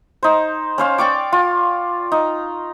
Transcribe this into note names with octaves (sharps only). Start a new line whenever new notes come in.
D#4 C5
C#4 C5 F5
D5 G5 C#6 D6
F4
D#4